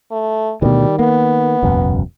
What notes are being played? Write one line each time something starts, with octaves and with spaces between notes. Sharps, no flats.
A3
D2 B2 D#3 G3
A#3 B3
E1 C#2 F#2